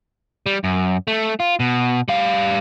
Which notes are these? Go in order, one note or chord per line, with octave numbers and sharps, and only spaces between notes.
G3
F#2
A3
F4
B2
G3 F5